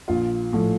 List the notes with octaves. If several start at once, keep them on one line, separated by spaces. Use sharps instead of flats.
A#1 F4
A2 F3